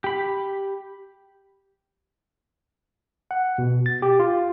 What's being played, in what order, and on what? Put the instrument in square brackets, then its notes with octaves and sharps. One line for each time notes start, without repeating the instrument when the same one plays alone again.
[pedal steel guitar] G4 B5
[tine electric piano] F#5
B2
A6
G4
F4